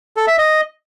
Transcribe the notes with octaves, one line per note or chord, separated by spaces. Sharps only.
A4
E5
D#5